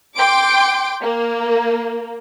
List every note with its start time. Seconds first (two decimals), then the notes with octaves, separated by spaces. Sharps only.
0.17 G5 C6 D6 D7
1.02 A#3